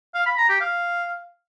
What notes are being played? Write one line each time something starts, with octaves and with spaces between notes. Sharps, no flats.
F5
B5
A#5
G4
F5